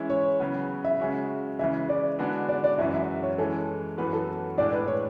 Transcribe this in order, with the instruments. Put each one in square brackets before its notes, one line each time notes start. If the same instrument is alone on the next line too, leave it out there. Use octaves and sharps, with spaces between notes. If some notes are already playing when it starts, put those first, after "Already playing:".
Already playing: [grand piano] E3 G#3 C#4 E4
[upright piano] C#5
[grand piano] C#3 F#3 B3
[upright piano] E5
[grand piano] C#3 G#3 C#4 F#4
[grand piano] C#3 E3 G#3 [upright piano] E5
[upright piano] D5
[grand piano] D3 G#3 B3 D4 F#4
[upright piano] D5
D5
[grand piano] F#2 E3 G#3 C#4 F#4 [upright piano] E5
[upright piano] E5
C#5
[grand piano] E3 G#3 C#4 [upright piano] A4
[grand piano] F#2 E3 B3 F#4 [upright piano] B4
[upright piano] A4
[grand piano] A2 G#3 D4 [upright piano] D5
[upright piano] B4
C#5